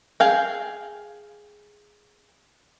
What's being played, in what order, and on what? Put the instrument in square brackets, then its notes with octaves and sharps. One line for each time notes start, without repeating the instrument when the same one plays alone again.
[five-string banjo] G#4 F5 G5